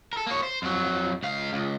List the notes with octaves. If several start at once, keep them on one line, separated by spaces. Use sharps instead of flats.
A4 A#4
A#3 C#5
C5
F2 F#3
C#2 F5
C#2